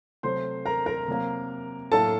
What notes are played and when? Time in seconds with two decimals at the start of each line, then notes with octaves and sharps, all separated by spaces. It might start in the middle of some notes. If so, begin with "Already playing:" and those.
0.23 C3 F#3 A3 C5 C6
0.66 A#4 A#5
0.86 A#4 A#5
1.08 C3 F#3 A#3
1.92 A2 F#3 A#3 A4 A5